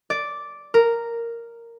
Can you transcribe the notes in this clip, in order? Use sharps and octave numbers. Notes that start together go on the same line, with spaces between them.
D5
A#4